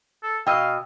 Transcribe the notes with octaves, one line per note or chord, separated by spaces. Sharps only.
A4
B2 D#5 F5 G5 E6